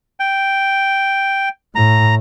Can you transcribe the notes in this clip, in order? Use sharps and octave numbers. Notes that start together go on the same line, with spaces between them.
G5
A2 A#5